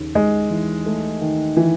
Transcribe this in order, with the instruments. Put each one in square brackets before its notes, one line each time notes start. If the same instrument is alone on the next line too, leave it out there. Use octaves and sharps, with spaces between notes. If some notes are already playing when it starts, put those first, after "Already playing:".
Already playing: [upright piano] D#2 C#3
[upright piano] D#2 [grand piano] G#3
[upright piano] E3
A3
D#3
[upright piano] D#3 [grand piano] E3